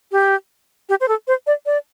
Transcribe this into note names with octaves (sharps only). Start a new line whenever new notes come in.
G4
G4
C5
A4
C5
D5
D5